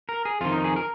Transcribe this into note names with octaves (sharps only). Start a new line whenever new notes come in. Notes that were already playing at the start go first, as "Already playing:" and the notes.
A#4
G#4
F2 D#3 F4
D#4
G#4
A#4